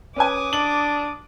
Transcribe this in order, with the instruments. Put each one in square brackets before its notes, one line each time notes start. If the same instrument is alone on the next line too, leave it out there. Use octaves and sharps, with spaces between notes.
[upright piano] C#4 B4 G#5 [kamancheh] D6 D#6
[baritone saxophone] D4 [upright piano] F#7